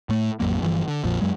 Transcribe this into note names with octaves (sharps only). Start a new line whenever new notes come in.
A2 A3
A1 F2 F#3 A#3
G1 G2 E3 F3
D3
A#1 F2 A#2 F3
F#2 F#3 G#3